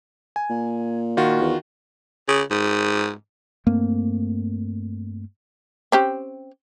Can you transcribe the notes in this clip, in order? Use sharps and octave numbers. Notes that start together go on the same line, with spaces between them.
G#5
A#2
D#3 F4 F#4
E2
C#3
G#2
G2 A3 A#3 C4
C4 C#4 G4